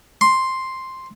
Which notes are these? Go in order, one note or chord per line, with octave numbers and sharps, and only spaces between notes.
C6